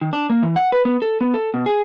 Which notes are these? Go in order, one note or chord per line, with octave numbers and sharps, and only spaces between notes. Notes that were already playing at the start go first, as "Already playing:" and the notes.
D#3
D4
A#3
E3
F#5
B4
B3
A4
B3
A4
B2
G#4